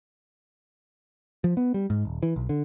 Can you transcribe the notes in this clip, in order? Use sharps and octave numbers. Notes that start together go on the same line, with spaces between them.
F3
B3
G3
G#2
D#1
E3
B1
D3